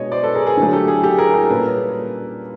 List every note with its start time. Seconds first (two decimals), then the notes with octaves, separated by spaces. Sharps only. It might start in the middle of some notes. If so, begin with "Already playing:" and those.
Already playing: B2 G#3 B3 D4 C#5 D#5
0.12 C5 D5
0.23 A4 B4
0.35 G#4 A#4
0.47 G#4
0.57 D3 F#3 A3 G#4
0.73 G4 A4
0.88 G#4
1.03 G4 A4
1.18 G#4 A#4
1.34 G#4 A#4
1.50 A#2 G3 A#3 C#4 A4 B4